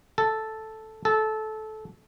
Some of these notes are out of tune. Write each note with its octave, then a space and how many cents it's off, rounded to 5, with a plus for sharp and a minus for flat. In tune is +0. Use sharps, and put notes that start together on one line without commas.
A4 -5
A4 -20